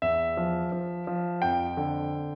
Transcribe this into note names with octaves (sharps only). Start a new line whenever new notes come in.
E2 E5
F3
F3
F3
F2 G5
D3